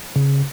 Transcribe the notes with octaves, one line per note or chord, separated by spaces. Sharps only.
C#3